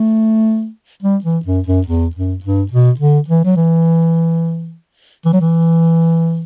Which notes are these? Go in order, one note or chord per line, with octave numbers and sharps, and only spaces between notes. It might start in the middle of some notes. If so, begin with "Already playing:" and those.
Already playing: A3
G3
E3
F#2
F#2
E2
F#2
G2
B2
D3
E3
F#3
E3
E3
F#3
E3